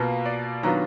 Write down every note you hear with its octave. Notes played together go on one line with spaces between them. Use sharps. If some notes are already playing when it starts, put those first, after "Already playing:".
Already playing: B2 A#3 F4 B4
D5
D#3 F#3 B3 D4 F4 A#5